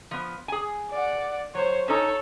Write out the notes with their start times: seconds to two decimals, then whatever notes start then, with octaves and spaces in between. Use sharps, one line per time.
0.11 F3 B3
0.48 G#4 G#5
0.91 D5 F#5
1.55 F#3 C5 C#5
1.88 C#4 D#4 A4 C#5